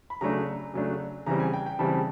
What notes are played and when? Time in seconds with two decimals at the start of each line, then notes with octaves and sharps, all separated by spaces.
0.10 B5
0.21 C#3 F#3 A3 D4 A#5
0.74 C#3 F#3 A3 D4
1.26 C#3 E3 G3 C4 A#5
1.40 G#5
1.53 G5
1.66 G5
1.79 C#3 E3 G3 C4 A5